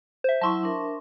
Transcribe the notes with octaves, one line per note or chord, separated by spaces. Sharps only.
C5 E5
F#3 E4 A5 C6 C#6
D4 A#4 E5